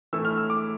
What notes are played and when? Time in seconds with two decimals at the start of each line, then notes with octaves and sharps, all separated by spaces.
0.13 A2 E3 A3 E4 E6
0.25 F6
0.37 E6
0.50 D6